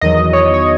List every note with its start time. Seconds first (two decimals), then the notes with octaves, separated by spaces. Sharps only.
0.01 E2 D#3 F#3 D#5
0.33 C#5
0.54 C#5